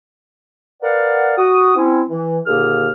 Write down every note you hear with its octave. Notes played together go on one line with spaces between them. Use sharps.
A#4 B4 D5 F5 F#5
F#4 D#6
C4 C#4 E4
E3
D#2 A#2 D3 A#3 G#4 F6